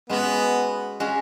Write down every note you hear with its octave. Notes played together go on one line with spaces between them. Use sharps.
G#3 B3 C#4 F#4
G#3 C#4 F#4